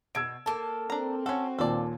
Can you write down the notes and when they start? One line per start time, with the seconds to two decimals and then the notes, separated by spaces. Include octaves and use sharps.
0.15 B2 E6 G#6 D7
0.46 A#3 A4 A5
0.90 C4 D4 A#5
1.26 C#4 F#4 A4 F#5
1.59 D#2 A#2 A4 D5